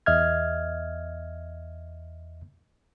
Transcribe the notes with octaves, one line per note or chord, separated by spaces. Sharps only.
E2 D#5 E5 F6 G#6